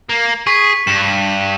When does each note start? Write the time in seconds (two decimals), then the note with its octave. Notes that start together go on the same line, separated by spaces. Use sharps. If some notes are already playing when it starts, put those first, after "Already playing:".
0.09 A#3
0.47 G#4 C#6 B6
0.87 G2 E7